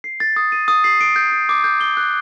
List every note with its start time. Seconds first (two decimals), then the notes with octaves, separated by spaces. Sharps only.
0.04 C7
0.20 A6
0.36 D#6
0.52 D#7
0.68 D#6
0.84 C7
1.01 D7
1.16 G6
1.32 G6
1.49 D6
1.64 G6
1.81 G7
1.97 F#6